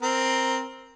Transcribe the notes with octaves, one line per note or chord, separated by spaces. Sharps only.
C4 A#4